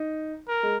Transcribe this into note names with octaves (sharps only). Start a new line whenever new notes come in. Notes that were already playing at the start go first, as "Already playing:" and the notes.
Already playing: D#4
A#4
G#3